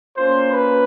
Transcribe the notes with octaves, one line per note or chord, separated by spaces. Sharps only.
A#3 C#4 F4 C5
B4